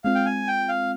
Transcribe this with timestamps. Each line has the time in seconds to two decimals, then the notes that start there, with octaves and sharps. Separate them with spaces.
0.04 G#3 C4 F4 F5
0.15 G5
0.26 G#5
0.48 G5
0.69 F5